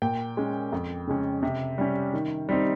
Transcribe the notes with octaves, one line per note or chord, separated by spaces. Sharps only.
A#2 G5
G#3 C#4
F2
C#3 G#3 C#4
C3
G3 C#4
D#3
G3 C4 D#4